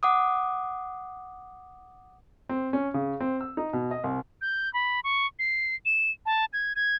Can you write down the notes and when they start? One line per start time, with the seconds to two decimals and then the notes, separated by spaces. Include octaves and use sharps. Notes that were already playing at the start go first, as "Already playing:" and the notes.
0.03 F#5 D6 D#6
2.49 C4
2.73 C#4
2.94 C#3
3.20 C4
3.41 E6
3.57 D#4
3.73 B2
3.91 D#5
4.04 C2
4.41 G6
4.74 B5
5.04 C#6
5.39 C7
5.86 E7
6.26 A5
6.53 G#6
6.76 G#6